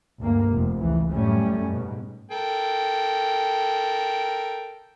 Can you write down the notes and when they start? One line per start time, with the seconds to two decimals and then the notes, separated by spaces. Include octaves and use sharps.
0.21 D2 G2 A#3
0.51 F1 F2
0.80 C#2 E3
1.10 F#2 A2 G3 A3 C#4
1.69 G#2 B2
2.31 A4 A#4 G5